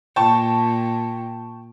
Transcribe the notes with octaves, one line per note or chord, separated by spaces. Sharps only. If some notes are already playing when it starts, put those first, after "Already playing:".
A#2 G5 A5 C#6